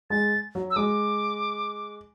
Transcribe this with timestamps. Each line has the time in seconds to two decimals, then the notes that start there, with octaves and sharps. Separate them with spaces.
0.10 G#3 A6
0.55 F#3
0.71 E6
0.76 G#3 D6